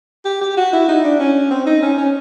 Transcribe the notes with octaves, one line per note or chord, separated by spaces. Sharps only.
G4
G4
F#4
E4
D#4
D4
C#4
C4
D#4
C#4
C#4